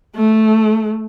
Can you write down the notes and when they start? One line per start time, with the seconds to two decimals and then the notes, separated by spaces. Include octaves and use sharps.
0.15 A3